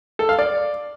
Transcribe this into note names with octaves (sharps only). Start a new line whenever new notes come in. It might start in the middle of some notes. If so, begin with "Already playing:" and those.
A4
F5
D5